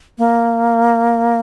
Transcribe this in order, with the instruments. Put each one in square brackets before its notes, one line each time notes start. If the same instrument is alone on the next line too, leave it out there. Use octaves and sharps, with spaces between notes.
[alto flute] A#3